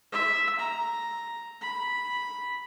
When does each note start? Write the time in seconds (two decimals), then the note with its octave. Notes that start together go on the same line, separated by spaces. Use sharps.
0.12 E5
0.59 A#5
1.61 B5